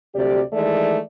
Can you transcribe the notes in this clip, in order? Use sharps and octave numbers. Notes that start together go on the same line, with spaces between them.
D2 C3 F#3 G4 D5
D#3 E3 G#3 A3 D5